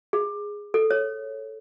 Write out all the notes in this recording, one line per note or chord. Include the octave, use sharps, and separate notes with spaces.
G#4
A4
C#5